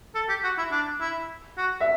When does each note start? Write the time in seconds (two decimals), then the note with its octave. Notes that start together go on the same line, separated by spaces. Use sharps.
0.15 A4
0.29 G4
0.44 F#4
0.58 E4
0.71 D4
1.01 E4
1.58 F#4
1.80 E5